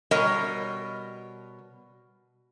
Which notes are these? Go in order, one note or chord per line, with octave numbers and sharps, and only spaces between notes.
B2 G3 A#4 C#5 D#5